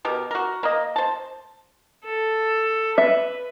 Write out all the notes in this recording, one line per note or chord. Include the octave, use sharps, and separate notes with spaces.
B2 G4 A#4
F#4 A#4
A#3 D#5
C5 A5
A4
B4 E5